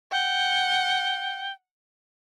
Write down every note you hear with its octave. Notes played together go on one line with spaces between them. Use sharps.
F#5 G5